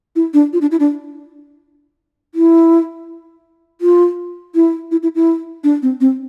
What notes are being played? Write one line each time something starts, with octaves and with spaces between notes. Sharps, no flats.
E4
D4
F4
D4
E4
D4
E4
F4
E4
E4
E4
E4
D4
C4
C4